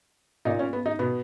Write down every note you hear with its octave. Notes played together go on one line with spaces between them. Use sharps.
A#2 D#4
C#4
B3
D#4
B2 B3